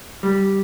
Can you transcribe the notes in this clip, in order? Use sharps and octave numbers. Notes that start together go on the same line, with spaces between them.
G3